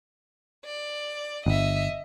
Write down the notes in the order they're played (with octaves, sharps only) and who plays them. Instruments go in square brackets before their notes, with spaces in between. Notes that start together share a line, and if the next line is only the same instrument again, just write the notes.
[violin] D5
[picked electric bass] G1 [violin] D#5 E5